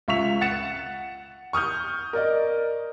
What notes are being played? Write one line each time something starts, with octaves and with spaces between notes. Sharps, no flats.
C#2 E5 C#6 B6 F7
F#5 A6 C#7 E7
C#6 D#6 F6 G6
A#4 D5 D#5